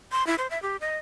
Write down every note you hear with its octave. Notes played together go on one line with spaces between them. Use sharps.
C6
E4
C5
E5
G4
D#5